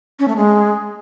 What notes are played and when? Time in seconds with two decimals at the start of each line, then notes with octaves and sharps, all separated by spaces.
0.19 C#4
0.28 A3
0.36 G#3